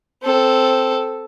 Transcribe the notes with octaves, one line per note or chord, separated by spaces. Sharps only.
C4 A4